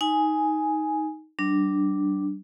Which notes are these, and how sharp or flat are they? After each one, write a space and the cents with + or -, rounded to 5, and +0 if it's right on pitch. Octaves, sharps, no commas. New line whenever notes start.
D#4 +10 G#5 +0
G3 -40 D4 +0